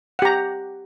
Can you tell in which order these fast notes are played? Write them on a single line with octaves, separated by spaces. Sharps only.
F#5 G4 A#5